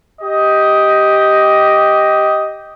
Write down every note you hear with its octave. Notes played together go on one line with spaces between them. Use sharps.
G4 D#5